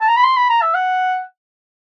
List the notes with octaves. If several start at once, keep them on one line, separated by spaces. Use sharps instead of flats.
A5
A#5
B5
C6
B5
A#5
E5
F#5